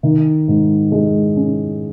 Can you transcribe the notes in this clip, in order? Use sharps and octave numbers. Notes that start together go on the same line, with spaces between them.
D#3
G#2
G#3
C#4